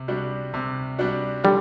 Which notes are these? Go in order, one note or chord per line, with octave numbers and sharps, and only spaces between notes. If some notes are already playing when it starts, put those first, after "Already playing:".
Already playing: C3
G3 D4 F#4
C3
G3 D4 F#4
D3 G3